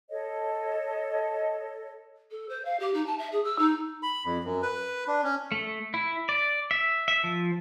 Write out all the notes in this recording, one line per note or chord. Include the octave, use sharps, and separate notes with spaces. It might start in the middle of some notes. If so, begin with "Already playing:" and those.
A4 C#5 D#5
A4
C5
F5
G4
D#4
A5
E5
G#4
E6
D#4
B5
F2
F#2
B4
D4
C#4
A3
E4
D5
E5
E5
F3